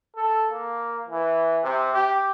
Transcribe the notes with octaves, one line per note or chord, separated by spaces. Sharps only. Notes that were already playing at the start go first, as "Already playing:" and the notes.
A4
A#3
E3
C3
G4